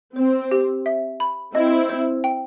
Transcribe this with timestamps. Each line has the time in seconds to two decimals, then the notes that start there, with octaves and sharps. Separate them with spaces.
0.16 C4 C5
0.51 G4
0.86 E5
1.20 B5
1.54 C4 E4 D#5
1.89 C5
2.24 G5